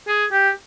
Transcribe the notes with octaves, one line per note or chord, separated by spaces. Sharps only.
G#4
G4